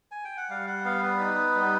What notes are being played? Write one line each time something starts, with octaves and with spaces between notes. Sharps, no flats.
G#5
G5
F#5
G3 F5
F#5
B3 F5
B4
D#4
G3